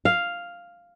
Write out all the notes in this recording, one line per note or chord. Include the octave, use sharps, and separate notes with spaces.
F5